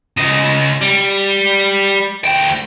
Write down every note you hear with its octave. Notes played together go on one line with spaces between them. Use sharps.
C#3 D#5
G3
D2 G5